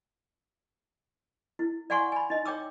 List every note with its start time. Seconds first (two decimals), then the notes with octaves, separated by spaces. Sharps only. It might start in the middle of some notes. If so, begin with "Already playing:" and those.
1.59 E4
1.90 D5 F5 F#5 G#5 C6 C#6
2.12 G#5 B5
2.30 D#4 D#5
2.45 C#5 G5 D6 E6